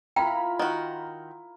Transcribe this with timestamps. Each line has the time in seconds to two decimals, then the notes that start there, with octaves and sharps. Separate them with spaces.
0.16 E4 F4 A#4 G5 A#5 B5
0.59 D#3 F#4